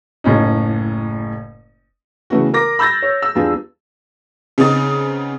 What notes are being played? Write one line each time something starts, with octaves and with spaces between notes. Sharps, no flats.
F#1 A2 C#4 D#4
C#3 E3 A3 B3 C#4 F#4
A#4 D6 A#6
B5 E6 G6 A6 A#6
C#5
E6
E2 G3 D4 F4 G#4
C#3 B3 C4 D#4 D#6 A6